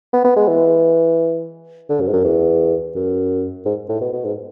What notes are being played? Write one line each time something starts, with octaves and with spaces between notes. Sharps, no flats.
B3
B3
G#3
E3
D3
F#2
G#2
F#2
E2
F#2
G#2
A2
B2
B2
G#2